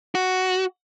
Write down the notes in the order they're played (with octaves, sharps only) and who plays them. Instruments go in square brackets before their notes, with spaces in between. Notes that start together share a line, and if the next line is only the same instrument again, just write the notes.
[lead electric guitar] F#4